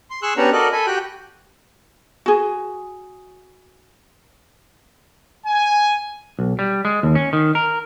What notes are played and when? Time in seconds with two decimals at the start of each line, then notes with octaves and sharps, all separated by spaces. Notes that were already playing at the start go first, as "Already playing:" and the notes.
0.10 C6
0.23 G#4 C6 C#6 E6 F#6
0.37 B3 C#4 D4 G4 F#5 A#5
0.53 F#4 A4 A#4 D5 D#5 F#6
0.72 A4 G#5 B5
0.87 F#4 G4 G5 F#6
2.26 F#4 G#4
5.46 G#5
6.39 B1
6.59 G3
6.85 G#3
7.03 D#2
7.15 C#4
7.33 D#3
7.55 A#4